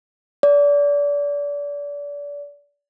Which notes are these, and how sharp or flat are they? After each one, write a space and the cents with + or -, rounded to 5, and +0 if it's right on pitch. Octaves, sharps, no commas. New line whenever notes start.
D5 -30